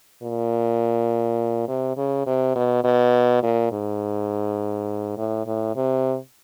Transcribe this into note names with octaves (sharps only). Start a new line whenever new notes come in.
A#2
C3
C#3
C3
B2
B2
A#2
G#2
A2
A2
C3